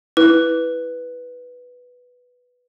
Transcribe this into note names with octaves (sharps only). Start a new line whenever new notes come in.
E4 B4